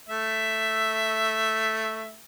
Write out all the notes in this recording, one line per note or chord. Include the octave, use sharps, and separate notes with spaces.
A3 E5